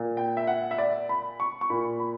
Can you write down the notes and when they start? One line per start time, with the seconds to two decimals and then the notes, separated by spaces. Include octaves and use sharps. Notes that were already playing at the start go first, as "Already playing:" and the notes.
Already playing: A#2
0.17 G5
0.37 E5
0.47 F#5
0.71 E5
0.78 D5
1.09 B5
1.40 C#6
1.61 C#6
1.70 A#2 B5
2.00 B5